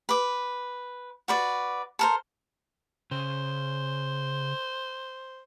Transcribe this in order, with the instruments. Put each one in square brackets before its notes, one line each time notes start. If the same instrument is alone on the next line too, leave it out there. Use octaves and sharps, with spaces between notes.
[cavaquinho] B4 D6
F#4 B4 D5
A4 A#4 C5
[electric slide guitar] C#3 [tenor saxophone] C5